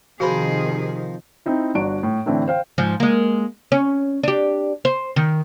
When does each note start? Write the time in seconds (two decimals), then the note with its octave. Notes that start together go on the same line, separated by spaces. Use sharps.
0.20 C3 D#3 F3 F#4 G#4 A#4 C5 B5
1.46 C4 D#4 E4
1.75 G1 D4 F#4 D7
2.03 A2
2.26 A2 D3 E3 C4 D4 E4
2.48 C5 F5 G5
2.78 G#2 F3
3.00 G#3 A#3
3.72 C#4
4.24 D4 G4
4.85 C5
5.16 D#3